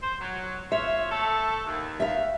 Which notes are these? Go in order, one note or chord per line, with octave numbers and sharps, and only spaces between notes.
C5
F#3
F4 C5 C#5 E5
A3 A4
D#2
E5 F5